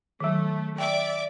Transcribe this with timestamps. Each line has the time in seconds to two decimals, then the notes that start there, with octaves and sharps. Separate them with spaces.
0.20 D#3 F#3 A3
0.78 D5 E5 G5 D6